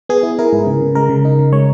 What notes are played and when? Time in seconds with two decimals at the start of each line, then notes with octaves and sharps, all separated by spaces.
0.09 B3 G#4
0.23 E4
0.39 E4 A#4
0.53 G#2
0.66 C#3
0.81 C#3
0.95 G#3 A#4
1.09 C#3
1.25 D#4
1.39 C#3
1.52 G#3 C#5